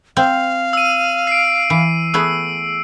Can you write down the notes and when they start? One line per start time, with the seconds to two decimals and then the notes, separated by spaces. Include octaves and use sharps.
0.17 C4 F5
0.73 E6 D#7
1.27 C7 D7
1.70 E3
2.14 A3 B3 G#4 E6